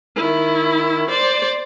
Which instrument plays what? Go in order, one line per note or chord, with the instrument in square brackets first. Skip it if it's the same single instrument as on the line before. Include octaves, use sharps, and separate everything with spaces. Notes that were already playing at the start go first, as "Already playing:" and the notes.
[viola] D#3 E4
C5 D5